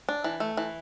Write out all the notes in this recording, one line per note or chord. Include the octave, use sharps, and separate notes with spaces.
D4
E3
A3
E3